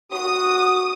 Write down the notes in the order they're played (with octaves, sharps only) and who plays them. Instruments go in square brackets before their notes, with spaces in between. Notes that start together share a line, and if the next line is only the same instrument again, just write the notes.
[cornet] F#4 [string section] D#6